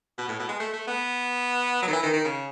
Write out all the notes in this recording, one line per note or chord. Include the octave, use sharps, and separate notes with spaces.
B2
A2
B2
G#3
A3
A3
B3
F#3
D#3
E3
D#3
D#3
C#3